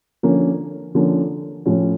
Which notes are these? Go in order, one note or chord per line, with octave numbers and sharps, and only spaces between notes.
D3 F3 A#3 C#4
D3 F3 A#3 C#4
A2 F3 C#4